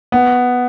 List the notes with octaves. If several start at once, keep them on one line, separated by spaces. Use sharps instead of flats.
B3